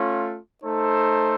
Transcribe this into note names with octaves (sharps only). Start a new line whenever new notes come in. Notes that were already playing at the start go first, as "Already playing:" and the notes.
Already playing: A3 C#4 F4
A3 D#4 A4 C5